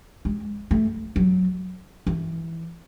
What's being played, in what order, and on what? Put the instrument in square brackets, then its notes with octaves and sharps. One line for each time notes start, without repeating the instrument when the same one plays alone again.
[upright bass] G#3
A3
F#3
E3